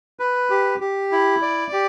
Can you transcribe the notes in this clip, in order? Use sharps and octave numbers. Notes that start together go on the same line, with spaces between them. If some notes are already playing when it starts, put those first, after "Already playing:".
B4
G4
G4
E4
D5
G4